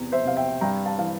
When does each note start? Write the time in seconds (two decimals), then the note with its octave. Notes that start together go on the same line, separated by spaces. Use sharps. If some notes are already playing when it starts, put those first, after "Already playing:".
Already playing: E2 C3
0.12 C5 E5
0.25 C3 F5
0.37 E5 G5
0.61 G2 G5 A#5
0.86 F5 A5
0.98 E3 F5